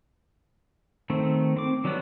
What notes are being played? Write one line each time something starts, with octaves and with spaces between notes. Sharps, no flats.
D#3 A3 C4
C4 D6
D#3 F#3 G3 A3 B3